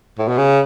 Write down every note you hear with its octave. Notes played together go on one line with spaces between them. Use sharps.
A2
B2
C#3